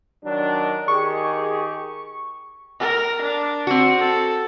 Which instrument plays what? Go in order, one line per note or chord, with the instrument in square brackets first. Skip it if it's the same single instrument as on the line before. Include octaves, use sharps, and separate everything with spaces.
[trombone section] D#3 F#3 D4
[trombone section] D#3 G4 G#4 [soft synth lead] C#6
[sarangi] A#4
D4
[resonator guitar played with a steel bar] C4 F#4
[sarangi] A4